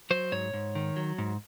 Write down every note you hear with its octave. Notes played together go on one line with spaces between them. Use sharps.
F#3 C5
G#2 C#5
G#2
D#3
F#3
G#2